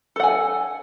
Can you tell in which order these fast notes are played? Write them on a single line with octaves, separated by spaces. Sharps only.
A4 F#5 G#5